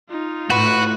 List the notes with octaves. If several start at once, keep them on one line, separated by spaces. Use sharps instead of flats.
D#4 F4
A2 F#4 B4 F#5